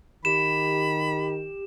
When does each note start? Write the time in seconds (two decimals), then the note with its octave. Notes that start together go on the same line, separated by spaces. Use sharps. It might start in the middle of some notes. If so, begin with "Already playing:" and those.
0.25 D#3 G4 B5 E7